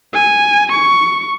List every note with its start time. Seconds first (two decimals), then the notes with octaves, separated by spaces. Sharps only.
0.14 G#5
0.72 C#6